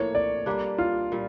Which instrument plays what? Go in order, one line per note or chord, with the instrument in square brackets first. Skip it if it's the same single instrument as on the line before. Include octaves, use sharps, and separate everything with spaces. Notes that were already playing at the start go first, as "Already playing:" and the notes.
Already playing: [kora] A2 F3 A#3 [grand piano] C#5
[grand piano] D5
[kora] G3 A#3 D4 G4
[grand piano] F4
[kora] A#2 G3